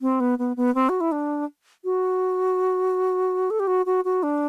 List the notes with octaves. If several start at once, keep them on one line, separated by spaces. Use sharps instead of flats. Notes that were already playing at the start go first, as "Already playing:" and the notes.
C4
B3
B3
B3
C4
F#4
E4
D4
F#4
A4
G4
F#4
F#4
F#4
D4